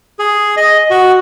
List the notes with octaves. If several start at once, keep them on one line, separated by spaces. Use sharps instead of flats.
G#4
D#5
F#4